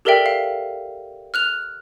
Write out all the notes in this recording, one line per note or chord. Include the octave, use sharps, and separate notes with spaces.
G4 A4 A#4 D5 E5 G5
F5
F6 F#6 F7